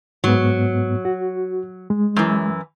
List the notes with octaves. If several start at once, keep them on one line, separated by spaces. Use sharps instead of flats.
G#2 F#3 B3
F#4
G#3
F#2 E3